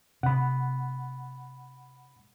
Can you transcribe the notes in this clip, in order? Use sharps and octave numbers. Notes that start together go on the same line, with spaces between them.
C3 F#5 B5